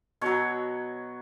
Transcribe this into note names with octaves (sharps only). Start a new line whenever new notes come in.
B2 F#3 C#5